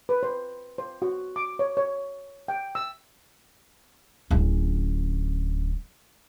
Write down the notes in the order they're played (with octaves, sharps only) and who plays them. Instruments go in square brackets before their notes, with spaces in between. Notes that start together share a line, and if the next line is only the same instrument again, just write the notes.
[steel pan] B4
C5
C5
F#4
D6
C#5
C#5
G5
E6
[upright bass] D1 C#4